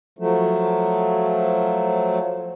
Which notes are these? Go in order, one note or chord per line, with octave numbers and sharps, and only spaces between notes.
F3 F#3 A3